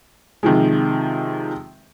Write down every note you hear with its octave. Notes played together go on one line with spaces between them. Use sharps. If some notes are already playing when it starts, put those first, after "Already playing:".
C3 D#3 F3 G#3